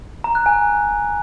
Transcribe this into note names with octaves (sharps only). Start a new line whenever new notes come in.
A#5
F#6
G#5